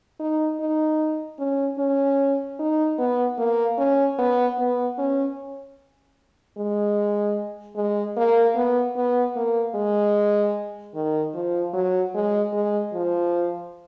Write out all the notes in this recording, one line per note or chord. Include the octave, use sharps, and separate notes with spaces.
D#4
D#4
C#4
C#4
D#4
B3
A#3
C#4
B3
B3
C#4
G#3
G#3
A#3
B3
B3
A#3
G#3
D#3
F3
F#3
G#3
G#3
F3